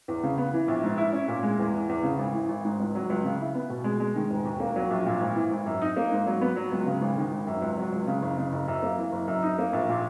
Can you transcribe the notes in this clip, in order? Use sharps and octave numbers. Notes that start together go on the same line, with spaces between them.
E2
C#3
B3
E3
A#1
G#2
E4
C#4
A#2
G#3
E2
E3
E2
C#3
G#1
E3
G#1
G#2
C#2
F#3
C#2
C#3
E4
B3
B2
G#3
G#3
D#3
E1
D#2
A#3
F#3
A#1
A#2
G#1
E3
G#1
F#2
D#4
A#3
G#2
F#3
B3
F#3
C#2
C#3
G#1
D#3
G#1
F#2
C#2
F#3
C#2
C#3
F#1
C#3
F#1
F#2
A#3
E3
F#1
F#2
D#4
A#3
A#1
A#2